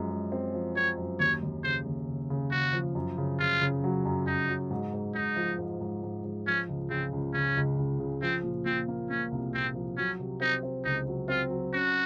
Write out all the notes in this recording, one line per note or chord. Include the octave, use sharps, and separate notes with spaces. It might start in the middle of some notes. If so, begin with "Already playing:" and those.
Already playing: F#2 F3 G#3
G#3
C4
F3
C4 C#5
F#2
D#2 C#5
D#2
C#3 C5
D#2
C#3
C#3
C#3 F#4
F3
F#2
C#3
C#3 F4
C#3
F#3
F#2
F#2 D#4
F#3
G#2
G#2
G#2 D#4
F3
G#2
G#2
G#2
G#2
F3 C#4
C#2
C#3 C4
C#2
C#3 C#4
C#2
C#2
C#3
F3 C4
A#2
A#2 C4
A#3
A#3 C#4
C2
A#2 C4
F3
F#3 C#4
C3
C4 D#4
C4
C#2 D#4
F#3
C4 F4
F#3
C#4 F#4